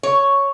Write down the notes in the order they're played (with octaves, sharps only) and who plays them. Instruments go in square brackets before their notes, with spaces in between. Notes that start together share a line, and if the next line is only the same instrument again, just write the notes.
[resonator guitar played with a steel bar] C#5